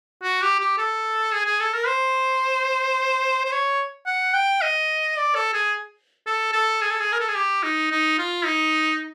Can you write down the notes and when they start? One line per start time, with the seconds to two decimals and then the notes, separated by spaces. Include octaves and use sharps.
0.23 F#4
0.42 G4
0.60 G4
0.78 A4
1.32 G#4
1.46 G#4
1.60 A4
1.73 A#4
1.87 C5
3.45 C5
3.52 C#5
4.07 F#5
4.34 G5
4.62 D#5
5.17 D5
5.35 A4
5.53 G#4
6.27 A4
6.53 A4
6.81 G#4
6.90 A4
7.00 G#4
7.13 A#4
7.20 A4
7.28 G#4
7.35 G4
7.63 D#4
7.91 D#4
8.18 F4
8.45 D#4